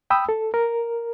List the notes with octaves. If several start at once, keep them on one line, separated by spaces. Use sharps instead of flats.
G5 B5 D#6 E6
A4
A#4